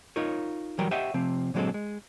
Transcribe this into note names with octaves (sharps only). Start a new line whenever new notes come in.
D#4 F4 A#4 C#5
E3 F#3 G3 A#4 G5
G4 C#5 D#5 E5 F#5 G5
C3 F3 C4
A#2 D3 F#3 G#3 C4 A4
G#3